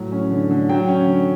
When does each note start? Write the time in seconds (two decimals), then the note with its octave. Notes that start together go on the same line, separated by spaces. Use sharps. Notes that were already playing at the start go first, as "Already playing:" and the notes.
Already playing: A2 F#3
0.12 C#4
0.31 D3
0.51 D3
0.69 F#3 G5
0.88 C#4
1.07 D3